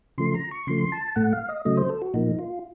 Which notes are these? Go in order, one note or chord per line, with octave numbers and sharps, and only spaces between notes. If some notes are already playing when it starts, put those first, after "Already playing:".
C#3 F3 A3 C6
A#5
C#6
C#3 F3 A3 C6
A5
A2 A3 F#5
F5
D#5
C#3 F#3 A3 D#5
C5
A4
F#4
A#2 F3 A#3 D#4
F4